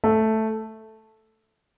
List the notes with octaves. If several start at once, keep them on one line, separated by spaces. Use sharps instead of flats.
A3